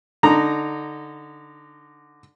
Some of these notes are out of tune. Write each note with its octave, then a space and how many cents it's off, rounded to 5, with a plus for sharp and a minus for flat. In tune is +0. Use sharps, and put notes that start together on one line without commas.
D3 +0 D#4 -15 A#5 +0